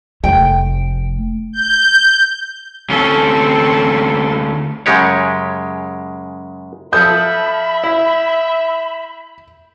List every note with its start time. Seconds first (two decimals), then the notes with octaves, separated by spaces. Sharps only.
0.24 F1 A3 G5
1.53 G6
2.89 D2 C4 C#4 A4
4.86 F#2 C#3 G#3 G4 C#5
6.93 F3 A4 E5 B5 D#6 G6
7.84 E4